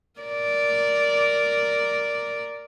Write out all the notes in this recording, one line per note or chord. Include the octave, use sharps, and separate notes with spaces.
A#4 D5